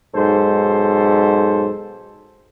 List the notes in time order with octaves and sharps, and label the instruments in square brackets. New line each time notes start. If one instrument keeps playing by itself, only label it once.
[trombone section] B1 G#2 A4 C5